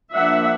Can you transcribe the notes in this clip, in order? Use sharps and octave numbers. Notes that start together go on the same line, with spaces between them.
F3 A#3 D4 E5 F#5